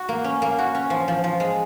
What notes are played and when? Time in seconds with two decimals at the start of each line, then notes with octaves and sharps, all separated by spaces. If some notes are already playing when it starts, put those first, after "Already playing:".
Already playing: F#4
0.09 A#3
0.24 C#4
0.42 A#3
0.58 F#4
0.75 C#4
0.90 F3
1.08 F3
1.24 F3
1.40 G#3